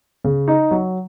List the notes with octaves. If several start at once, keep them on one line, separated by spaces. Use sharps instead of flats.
C#3
D#4
F#3